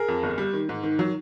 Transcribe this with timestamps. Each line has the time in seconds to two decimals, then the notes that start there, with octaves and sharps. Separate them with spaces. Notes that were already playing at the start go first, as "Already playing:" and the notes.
Already playing: G#4 A#4
0.08 F2
0.23 G1
0.38 G3
0.53 D#3
0.69 G#2
0.83 D#3
0.99 F#3